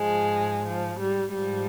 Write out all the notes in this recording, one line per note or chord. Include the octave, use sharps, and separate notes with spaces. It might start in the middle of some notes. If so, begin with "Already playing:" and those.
Already playing: G#2 F3 G#3
F3
G3
G#2 F3 G3